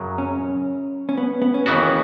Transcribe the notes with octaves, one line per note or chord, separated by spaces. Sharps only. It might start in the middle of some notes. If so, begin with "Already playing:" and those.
Already playing: F#2 C#3 F#3
C#4
C#4
B3
B3
C#4
D#2 C#3 E3 B3 F#4